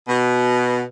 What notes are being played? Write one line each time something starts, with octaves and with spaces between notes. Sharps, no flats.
B2